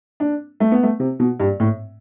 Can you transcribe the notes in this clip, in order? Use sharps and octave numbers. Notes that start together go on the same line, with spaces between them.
D4
A3
B3
A3
C3
B2
G2
A2